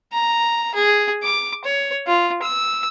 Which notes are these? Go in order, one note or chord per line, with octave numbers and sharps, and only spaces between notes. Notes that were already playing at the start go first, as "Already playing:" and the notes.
A#5
G#4
D6
C#5
F4
E6